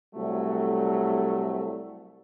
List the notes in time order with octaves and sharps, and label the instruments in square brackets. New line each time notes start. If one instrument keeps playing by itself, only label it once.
[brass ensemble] C2 F#3 A3